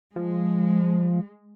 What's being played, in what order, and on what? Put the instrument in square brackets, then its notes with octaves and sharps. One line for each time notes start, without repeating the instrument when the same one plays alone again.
[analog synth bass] F3 [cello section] G#3